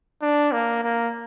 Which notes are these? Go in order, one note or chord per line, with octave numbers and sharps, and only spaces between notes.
D4
A#3
A#3